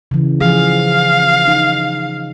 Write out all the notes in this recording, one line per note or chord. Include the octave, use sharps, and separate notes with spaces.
C#3 E3
E3 F3 G#4 F5
D#4